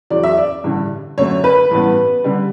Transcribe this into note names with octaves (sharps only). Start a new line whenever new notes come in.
E2 C#3 F#3 D5
E5
D5
A1 G2 D3
F#2 D3 A3 C#5
B4
A1 G2 E3 B3
D3 G3